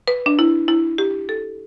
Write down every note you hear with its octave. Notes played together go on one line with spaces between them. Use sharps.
B4
D4
E4
E4
G4
A4